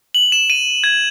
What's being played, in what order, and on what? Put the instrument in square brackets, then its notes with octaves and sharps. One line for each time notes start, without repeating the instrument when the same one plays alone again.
[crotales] F#7
E7
D#7
G#6